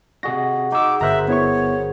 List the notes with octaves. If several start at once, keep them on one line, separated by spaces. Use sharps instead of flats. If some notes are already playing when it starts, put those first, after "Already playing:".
C3 F#4 G#4 D#5 A#6
D#4 G#4 D6 E6
G1 A#4 C5 E5 A#5 F#6
B3 E4 C#5 C#6